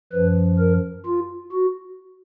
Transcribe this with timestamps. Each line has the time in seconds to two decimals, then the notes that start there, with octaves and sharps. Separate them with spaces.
0.13 F#2 F3 B4
0.59 A#4
1.06 F4
1.52 F#4